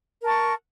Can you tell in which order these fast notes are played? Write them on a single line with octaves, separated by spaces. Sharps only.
A#4 A5 C#6